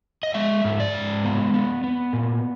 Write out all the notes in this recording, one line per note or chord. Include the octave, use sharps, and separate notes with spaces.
D#5
G#3 E5
G#2
D5
G#3
B3
B3
B3
A#2